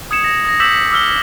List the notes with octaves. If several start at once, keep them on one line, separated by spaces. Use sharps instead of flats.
D#6 G#6 C#7 E7
A#6
D#6 G#6 A#6
D6 E6 G6 B6 E7 F#7
D6 E6 F6 G7